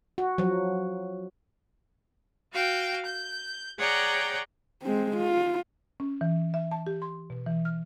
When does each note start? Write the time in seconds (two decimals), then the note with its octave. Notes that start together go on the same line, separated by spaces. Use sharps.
0.18 F#4
0.38 F3 F#3
2.52 F#4 F5 G5
3.05 G6
3.77 G#4 C#5 D5 F#5 G5 A#5
4.82 G#3 C4
5.17 F4
6.00 C#4
6.21 E3
6.54 E5
6.71 A5
6.87 G4
7.02 C6
7.30 B2
7.46 E3
7.65 F6